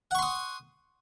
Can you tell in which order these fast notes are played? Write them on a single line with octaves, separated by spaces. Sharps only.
F#5 C#6 C6 D#6